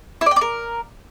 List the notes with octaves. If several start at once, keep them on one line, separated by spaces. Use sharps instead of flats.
E4
D5
G5
D5
A#4